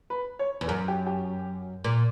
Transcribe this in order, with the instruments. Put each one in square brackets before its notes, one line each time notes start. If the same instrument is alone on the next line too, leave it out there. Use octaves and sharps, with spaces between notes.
[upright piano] B4
C#5
[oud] E2
[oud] F#2 [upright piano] A#4
[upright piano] G4
G4
[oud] A#2